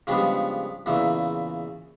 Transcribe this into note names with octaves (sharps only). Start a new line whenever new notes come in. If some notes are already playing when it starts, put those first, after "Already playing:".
C#3 F3 G3 G#3 B3 D4
E2 A#2 C#3 E3